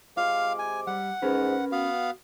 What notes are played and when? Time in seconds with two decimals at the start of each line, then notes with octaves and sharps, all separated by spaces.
0.17 C3 G#3 F4 F5 D6
0.59 G#5
0.87 G3 F#5
1.22 G#2 C#4 A#4 B4
1.72 B3 F#4 F5